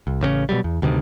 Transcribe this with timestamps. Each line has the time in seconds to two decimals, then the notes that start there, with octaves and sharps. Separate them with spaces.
0.07 C2
0.21 A1 C#3 A#3 C#4
0.49 B2 D3 F#3 G3
0.64 E2
0.82 D2 G2 C3 D#3